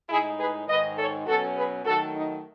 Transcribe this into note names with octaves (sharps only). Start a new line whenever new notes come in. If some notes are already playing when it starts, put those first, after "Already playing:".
A2 G#3 D#4 E4 G#4
G#4 B4
G#2 D#3 G#3 B4 D#5
A4 C#5
B2 F#3 C#4 F#4 A4
G#4 B4
D#3 F#3 A3 F#4 A4
D#4